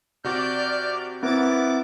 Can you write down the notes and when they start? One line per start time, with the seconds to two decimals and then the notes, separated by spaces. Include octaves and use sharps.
0.24 C3 F#4 D5 D6 F6 G6
1.23 B3 C4 E4 A#4 D6 A6